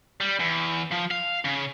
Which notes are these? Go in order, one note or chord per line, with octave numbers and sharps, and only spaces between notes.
G3
E2
F3
F5
C#3